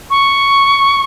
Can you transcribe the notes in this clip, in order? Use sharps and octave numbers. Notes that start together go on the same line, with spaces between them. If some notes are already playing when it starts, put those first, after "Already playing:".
C#6